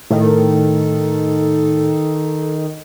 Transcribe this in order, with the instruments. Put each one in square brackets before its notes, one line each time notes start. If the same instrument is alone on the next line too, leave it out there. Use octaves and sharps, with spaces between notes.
[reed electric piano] A2 [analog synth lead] D#3 [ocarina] A4